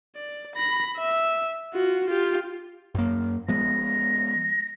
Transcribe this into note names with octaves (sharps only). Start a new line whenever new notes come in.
D5
B5 A#6
E5
F4 F#4
F4 G4
F#2 A#3
F3 G#3 B3 A#6